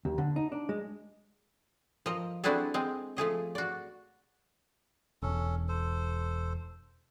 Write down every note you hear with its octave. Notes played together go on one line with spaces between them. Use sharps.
D#2
D3
D#4
D4
G#3
F3 A#4 D#5
C4 D4 E4 F#4 G#4 A4
G#3 C4
F3 A3 G#4 D#5
F#4 D5
E1 C#4 A4
A4 C5